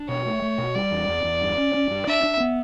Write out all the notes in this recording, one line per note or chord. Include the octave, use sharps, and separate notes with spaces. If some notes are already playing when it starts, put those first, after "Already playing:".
Already playing: D4
B2 C#5
A3
A3
B2
G3 D5
E2
E2
E2
G2
C#4
C#4
G2
D4 E5
D4
B3